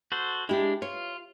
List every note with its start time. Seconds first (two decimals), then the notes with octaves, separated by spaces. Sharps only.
0.12 F#4 A4 C5
0.49 G#3 D4 E4 G4
0.82 F4 C#5